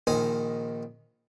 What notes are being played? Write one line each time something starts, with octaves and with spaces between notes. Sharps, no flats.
A#1 D#3 D#4 C5 G#5